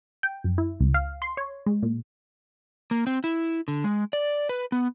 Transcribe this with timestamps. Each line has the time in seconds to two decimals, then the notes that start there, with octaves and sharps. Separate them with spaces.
0.23 G5
0.44 F#2
0.58 E4
0.80 C#2
0.94 F5
1.22 C6
1.37 C#5
1.66 G#3
1.83 A#2
2.91 A#3
3.07 C4
3.24 E4
3.68 D3
3.84 G#3
4.13 D5
4.49 B4
4.72 B3